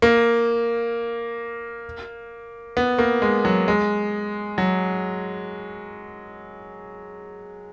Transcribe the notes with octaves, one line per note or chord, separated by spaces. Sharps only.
A#3
B3
A#3
G#3
F#3
G#3
F#3